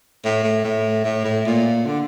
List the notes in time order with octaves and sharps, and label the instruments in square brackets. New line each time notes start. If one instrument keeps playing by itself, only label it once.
[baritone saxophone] A2
A2
A2
A2
A2
A#2
D3